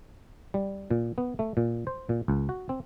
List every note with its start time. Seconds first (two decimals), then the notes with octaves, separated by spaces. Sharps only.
0.54 G3
0.91 A#2
1.18 B3
1.39 A3
1.57 A#2
1.87 C5
2.09 A#2
2.28 C#2
2.49 F#4
2.69 C4